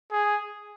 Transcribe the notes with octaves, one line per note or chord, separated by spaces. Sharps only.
G#4